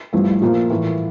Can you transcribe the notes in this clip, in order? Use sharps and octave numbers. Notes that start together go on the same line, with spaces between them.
G2 F3 A3 E4
E4
A#2 F3 A#3 F4
A2 E3 A3